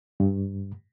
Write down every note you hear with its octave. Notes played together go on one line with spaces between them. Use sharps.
G2